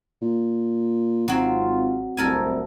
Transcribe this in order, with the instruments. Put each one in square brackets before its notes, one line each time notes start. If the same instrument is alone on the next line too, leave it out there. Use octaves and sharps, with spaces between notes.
[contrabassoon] A#2
[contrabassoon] G#1 [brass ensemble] G#2 F4 [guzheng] F#3 C4
[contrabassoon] D1 [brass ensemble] C2 [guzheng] A4 A#4 G#5